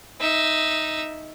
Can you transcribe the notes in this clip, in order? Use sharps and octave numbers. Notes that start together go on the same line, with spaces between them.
D#4 E5